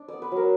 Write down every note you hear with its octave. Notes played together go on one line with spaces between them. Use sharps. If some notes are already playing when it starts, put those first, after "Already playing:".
Already playing: D4
B3 D5
B4
F#3 A#4